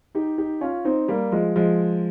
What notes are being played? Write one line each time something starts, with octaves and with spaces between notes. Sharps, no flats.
D#4 G4
D#4 G4
C#4 F4
C4 D#4
G3 A#3
F3 G#3
F3 G#3